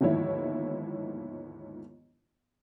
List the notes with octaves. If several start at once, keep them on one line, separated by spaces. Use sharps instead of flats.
G1 D#2 G#2 F3 E4 C#5